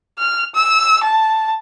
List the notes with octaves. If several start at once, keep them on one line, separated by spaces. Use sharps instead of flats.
F6
E6
A5